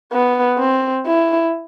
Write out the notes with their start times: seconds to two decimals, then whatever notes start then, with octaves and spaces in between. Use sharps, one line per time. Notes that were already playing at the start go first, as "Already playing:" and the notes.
0.13 B3
0.59 C4
1.06 E4